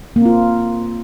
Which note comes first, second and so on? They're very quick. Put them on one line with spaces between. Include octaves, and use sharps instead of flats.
A#3 C4 F4